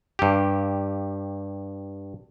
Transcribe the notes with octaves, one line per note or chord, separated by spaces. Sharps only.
G2 G4